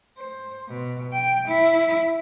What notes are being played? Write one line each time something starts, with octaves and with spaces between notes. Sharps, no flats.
C5
B2
G5
E4